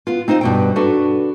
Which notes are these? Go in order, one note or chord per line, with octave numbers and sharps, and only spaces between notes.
B3 F4
C4 D#4 F4 C5
G2 B2 G5
D4 F#4 A4 B4